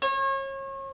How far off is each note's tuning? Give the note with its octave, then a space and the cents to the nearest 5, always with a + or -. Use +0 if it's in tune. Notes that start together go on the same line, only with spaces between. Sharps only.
C#5 -35